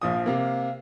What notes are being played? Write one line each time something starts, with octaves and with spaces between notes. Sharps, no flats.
A#1 F3 F5 D#6
C3 A#3 F5